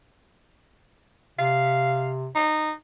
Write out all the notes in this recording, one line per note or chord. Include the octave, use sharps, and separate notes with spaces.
C3 F5
D#4